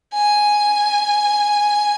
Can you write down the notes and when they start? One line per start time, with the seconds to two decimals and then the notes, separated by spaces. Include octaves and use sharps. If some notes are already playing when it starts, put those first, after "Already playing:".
0.14 G#5